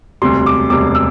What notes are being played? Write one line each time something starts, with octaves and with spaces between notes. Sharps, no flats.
E1 D2 C3 G3 C6
D6
E1 D2 C3 G3 D6
E6